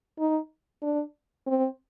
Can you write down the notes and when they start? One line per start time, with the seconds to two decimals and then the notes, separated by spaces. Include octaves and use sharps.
0.19 D#4
0.82 D4
1.47 C4